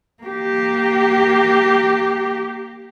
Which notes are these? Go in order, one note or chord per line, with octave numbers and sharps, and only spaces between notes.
A#3 G4